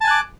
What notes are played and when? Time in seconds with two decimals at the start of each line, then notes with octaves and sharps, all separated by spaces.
0.01 A5
0.04 G#5
0.07 F#6
0.11 D6